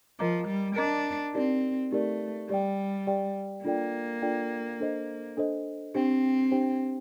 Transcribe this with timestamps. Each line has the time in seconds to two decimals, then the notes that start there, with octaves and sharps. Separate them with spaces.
0.19 F3 A#4 D#5 A#5 D6
0.47 G3
0.76 D4 A#4 D#5 A#5 D6
1.34 C4 D#4 G4 A#4 D5
1.92 A3 D#4 G4 A#4 D5
2.49 G3 G4 D5 G5
3.07 G4 D5 G5
3.64 A#3 D4 F4 A4 D5 G5
4.22 D4 F4 A4 D5 G5
4.80 D4 A4 C5 D#5
5.37 D4 A4 C5 D#5
5.95 C4 D4 G4 C5 G5
6.51 D4 G4 C5 G5